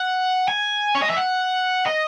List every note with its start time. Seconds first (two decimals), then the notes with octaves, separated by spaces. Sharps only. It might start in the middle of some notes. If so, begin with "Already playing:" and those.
Already playing: F#5
0.48 G#5
0.95 C#5
1.02 D#5
1.10 E5
1.17 F#5
1.86 D#5